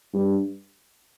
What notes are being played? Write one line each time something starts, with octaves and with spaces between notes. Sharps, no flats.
G2